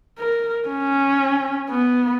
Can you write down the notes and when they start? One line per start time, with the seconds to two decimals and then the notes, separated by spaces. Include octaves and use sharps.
0.18 A#4
0.67 C#4
1.70 B3